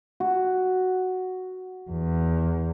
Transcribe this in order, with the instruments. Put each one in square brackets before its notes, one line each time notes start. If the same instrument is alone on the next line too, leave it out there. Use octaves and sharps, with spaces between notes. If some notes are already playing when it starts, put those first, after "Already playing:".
[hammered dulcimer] F#4
[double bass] E2